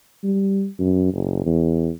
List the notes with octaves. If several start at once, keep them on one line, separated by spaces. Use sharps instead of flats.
G3
F#2
F#1
E2